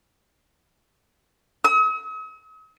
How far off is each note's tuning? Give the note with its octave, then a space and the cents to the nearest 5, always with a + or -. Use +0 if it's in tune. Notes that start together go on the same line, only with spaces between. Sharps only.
D#6 +45